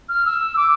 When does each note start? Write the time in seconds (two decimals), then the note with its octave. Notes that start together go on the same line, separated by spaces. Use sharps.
0.09 F6
0.26 E6
0.57 D6